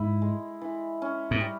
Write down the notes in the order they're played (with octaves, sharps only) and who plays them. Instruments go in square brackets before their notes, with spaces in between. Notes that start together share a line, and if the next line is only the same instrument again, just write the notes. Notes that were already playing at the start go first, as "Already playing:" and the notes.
Already playing: [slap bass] G#2 [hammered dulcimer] E4
[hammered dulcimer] G#3
E3
C#4
[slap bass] G#2
[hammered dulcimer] G3